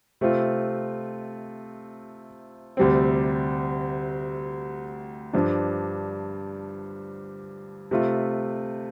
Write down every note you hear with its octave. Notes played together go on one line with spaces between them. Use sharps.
C3 A3 C4 F4
D2 C3 G3 C4
G2 F3 D4
C3 A3 F4